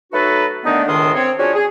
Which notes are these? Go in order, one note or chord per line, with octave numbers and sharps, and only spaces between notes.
F#3 A3 D#4 F#4 A4 B4
D3 D#3 A3 B3 D4 D#4
C#2 A2 D#3 D4 C6 D#6
C4 C#5
C#4 D4 F4 F#4 G#4 C#5
G#4